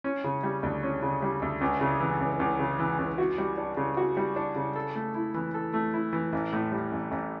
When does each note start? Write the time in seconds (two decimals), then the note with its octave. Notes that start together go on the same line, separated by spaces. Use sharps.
0.04 C#4
0.24 C#3
0.43 G3
0.63 D2
0.83 C#4
1.02 C#3
1.22 G3
1.42 D2
1.61 C#2
1.81 C#3
2.00 E3
2.20 C#2
2.40 C#2
2.59 C#3
2.79 E3
2.99 C#2
3.18 F#4
3.38 G3
3.58 D4
3.77 C#3
3.97 F#4
4.17 G3
4.36 D4
4.56 C#3
4.76 A4
4.95 A3
5.15 E4
5.34 E3
5.54 A4
5.74 A3
5.94 E4
6.13 E3
6.32 A1
6.53 A2
6.72 G3
6.92 A1
7.11 A1